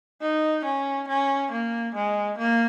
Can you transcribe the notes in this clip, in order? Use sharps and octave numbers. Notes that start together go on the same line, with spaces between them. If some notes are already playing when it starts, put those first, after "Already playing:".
D#4
C#4
C#4
A#3
G#3
A#3